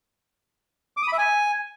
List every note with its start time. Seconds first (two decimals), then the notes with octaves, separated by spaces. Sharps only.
0.97 D6
1.02 D#6
1.07 B5
1.13 E5
1.18 G#5